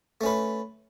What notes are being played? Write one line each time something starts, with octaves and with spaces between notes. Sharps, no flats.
A3 C#4 B4